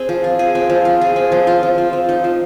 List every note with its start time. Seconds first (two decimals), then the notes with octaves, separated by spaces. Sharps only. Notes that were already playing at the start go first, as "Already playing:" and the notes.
Already playing: C4 G#4
0.09 F3
0.24 F4
0.39 G#4
0.55 C4
0.70 F3
0.85 F4
1.01 G#4
1.16 C4
1.32 F3
1.47 F4
1.63 F3
1.78 C4
1.93 F3
2.09 D#4
2.24 F3